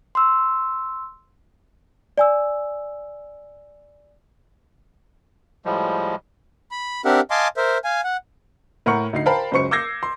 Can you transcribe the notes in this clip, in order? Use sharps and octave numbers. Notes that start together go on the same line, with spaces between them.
C6 E6
D5 G#5 E6
A2 F3 G3 G#3
B5
C4 D4 G4 A#4 E5 F#5
D#5 F5 G#5 A5 C6 D6
A#4 C5 E5
F5 G#5
F#5
A2 A#4 F#5 C#6 C#7
D2 D#4 C7
A#4 C5 F5 G5 A5 B5
C#2 F#2 C5 C#6 C#7
D6 E6 G6 G#6 A#6 C7
C6